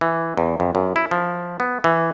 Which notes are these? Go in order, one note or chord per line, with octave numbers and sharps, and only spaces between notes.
E3
E2
F2
F#2
E4
F3
B3
E3